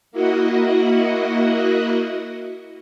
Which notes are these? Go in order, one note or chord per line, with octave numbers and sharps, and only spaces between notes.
A#3 E4 F#4 D#5 F#5